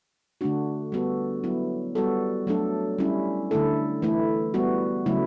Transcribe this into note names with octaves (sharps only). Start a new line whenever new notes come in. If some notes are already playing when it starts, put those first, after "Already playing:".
D3 A3 D4 F#4
G3 B3 F#4 A4
F#3 B3 E4
G3 B3 F#4 A4
F#3 A3 D4 A4
G3 C#4 E4
D3 A3 E4 A4
E3 A3 E4
G3 B3 F#4
C#3 F#3 A3 E4